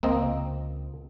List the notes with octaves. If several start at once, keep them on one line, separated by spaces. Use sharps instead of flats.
C#2 C3 A#3 C4 D#5